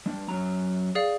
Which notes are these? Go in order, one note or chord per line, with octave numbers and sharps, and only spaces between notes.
G3 D4
F#2 F#3 A#5
G#4 D5 F5